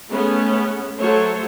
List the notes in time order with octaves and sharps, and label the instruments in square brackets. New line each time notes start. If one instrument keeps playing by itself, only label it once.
[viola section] G#3 A3 B3 C#4
F#3 A3 A4 C5 C#5